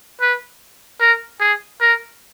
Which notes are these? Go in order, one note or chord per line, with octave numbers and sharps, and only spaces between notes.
B4
A#4
G#4
A#4